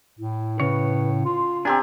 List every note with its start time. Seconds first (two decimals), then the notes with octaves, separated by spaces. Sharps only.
0.19 A2 E4
0.60 C#3 B4 C#5
1.25 F4 C6
1.65 C4 D4 G4 G#5 A#5